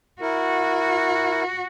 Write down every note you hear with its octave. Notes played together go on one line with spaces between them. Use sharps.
E4 F#4 A#4